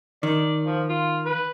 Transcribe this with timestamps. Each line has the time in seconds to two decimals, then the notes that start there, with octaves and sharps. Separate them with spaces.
0.23 D#3 D5
0.65 F3
0.89 F4
1.26 B4